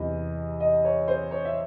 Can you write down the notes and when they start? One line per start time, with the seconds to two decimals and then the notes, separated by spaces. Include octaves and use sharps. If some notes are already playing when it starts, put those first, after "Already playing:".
Already playing: E2 C3 E3 D#5
0.60 D#5
0.85 C#5
1.08 C5
1.31 C#5
1.45 E5